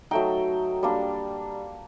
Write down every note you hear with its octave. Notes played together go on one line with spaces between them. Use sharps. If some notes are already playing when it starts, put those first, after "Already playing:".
F#3 A3 D#4 G5
G3 A#3 D4